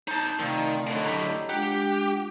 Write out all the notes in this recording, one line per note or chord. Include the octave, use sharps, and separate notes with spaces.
D#4 C5 D#5 A5
C3 D#3 F3 A3 C4 D5 F5
A2 D3 C#5 D#5
G4 E5 A#5
G#3 D4 F4 G4 F#5